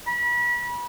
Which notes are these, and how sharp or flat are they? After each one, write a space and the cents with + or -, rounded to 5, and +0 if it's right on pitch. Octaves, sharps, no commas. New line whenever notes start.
B5 -35